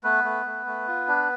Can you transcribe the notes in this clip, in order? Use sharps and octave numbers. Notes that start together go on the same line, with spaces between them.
A3 B3 B4
A3
A3
A3
F4
D4